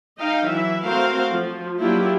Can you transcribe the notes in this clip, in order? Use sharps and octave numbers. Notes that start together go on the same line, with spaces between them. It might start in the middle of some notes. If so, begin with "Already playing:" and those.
D#4 D#5 F5 G5
E3 F#3 E4 E5
A3 C4 F#4 A#4 C5 F5
F3
F#3 A#3 D4 E4 F4 G4